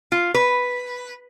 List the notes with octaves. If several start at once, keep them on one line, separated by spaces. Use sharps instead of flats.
F4
B4